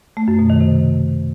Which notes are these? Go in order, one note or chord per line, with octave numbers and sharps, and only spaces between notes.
A3
F#2
B2
D#3
C3